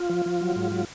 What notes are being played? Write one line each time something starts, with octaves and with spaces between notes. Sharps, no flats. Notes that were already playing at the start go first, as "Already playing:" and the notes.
Already playing: F4
F3
F3
F#3
G#2
F#3